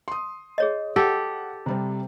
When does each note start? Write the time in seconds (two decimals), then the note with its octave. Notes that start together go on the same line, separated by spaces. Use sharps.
0.08 C6 D#6
0.58 G#4 C#5 D#5
0.96 G4 A4 F#5
1.66 C3 G3 C4